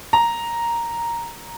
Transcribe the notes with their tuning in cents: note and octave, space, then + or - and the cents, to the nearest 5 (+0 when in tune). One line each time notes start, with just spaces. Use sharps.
A#5 +0